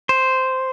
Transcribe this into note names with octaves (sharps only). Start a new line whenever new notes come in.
C5